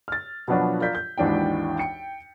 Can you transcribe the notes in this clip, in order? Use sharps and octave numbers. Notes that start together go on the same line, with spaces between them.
F6 A6
B2 F3 F#3 B3 D4 F#4
F4 A#4 D5 G6 B6
G6
G#1 D#2 E3 D4 D#4 G5
G5 C#7